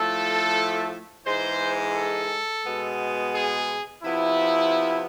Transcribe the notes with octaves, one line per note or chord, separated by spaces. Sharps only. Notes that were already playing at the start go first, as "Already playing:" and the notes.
Already playing: A2 F3 A3 A4
G#2 E3 G#3 C5
A4
B2 G#3 B3
G#4
C3 F3 B3 E4